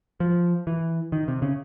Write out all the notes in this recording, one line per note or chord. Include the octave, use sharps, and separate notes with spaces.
F3
E3
D#3
C3
C#3